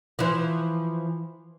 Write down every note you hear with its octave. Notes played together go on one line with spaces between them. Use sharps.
E3 F3